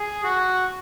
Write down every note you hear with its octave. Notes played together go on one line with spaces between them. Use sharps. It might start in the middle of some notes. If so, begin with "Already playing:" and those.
Already playing: G#4
F#4